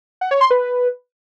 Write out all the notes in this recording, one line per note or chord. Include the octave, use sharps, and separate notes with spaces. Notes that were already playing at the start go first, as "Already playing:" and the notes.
F#5
C#5
C6
B4